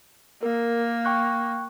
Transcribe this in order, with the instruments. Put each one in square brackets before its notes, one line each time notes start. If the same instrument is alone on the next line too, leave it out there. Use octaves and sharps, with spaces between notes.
[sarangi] A#3 [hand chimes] A#4
[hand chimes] G5 C#6 F#6